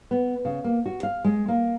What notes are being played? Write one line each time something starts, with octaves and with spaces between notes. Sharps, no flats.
B3
C#3
A#3
F#4
F5
G#3
A#3